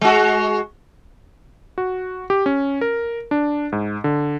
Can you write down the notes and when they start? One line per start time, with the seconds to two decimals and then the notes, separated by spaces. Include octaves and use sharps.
0.01 G#3 F#4
1.78 F#4
2.30 G4
2.46 C#4
2.81 A#4
3.31 D4
3.72 G#2
4.04 D3